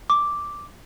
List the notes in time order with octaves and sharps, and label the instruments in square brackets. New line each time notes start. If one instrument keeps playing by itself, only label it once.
[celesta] D6